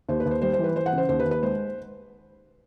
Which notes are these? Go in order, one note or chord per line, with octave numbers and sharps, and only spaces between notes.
D#2 C5
B4
D#2
C5
G3 C5
C5
E3
B4
E3 C5
F#5
C#3
C5
D#2 C5
B4
D#2
B4
G#3 C5